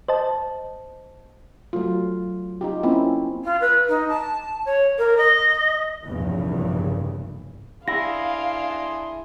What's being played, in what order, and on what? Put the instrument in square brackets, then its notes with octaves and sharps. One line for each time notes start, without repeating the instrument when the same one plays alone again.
[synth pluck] C5 D#5 A5
[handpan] F#3 A3 F4
D#4 F4 G4
A#3 C4 C#4 E4 F4
[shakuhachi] F4
B4
D#4
A5
C#5
A#4
D#5
[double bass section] F1 A#1 E2 G2 A#2 C#3
[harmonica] D4 G#4 C6 [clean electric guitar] E4 [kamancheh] F5 [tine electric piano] A#6